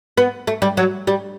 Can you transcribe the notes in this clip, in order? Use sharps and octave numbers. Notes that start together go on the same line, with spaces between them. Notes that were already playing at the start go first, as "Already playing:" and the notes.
B3
A3
G3
F#3
G3